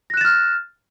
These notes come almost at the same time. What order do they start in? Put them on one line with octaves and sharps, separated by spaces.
A#6 F#6 E7 A6 F6